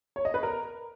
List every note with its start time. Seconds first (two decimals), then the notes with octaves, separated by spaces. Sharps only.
0.16 C#5
0.25 D#5
0.34 B4
0.43 A#4